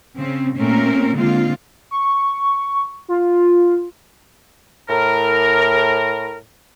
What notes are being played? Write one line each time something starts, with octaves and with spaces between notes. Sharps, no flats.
C#3 C4
A#2 A3 C4 C#4 A#4
D3 G#3 A#3 C4 F4
C#6
F4
A2 A#4